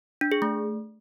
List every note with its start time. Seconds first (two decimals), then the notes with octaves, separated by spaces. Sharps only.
0.21 D4
0.32 G#4
0.42 A3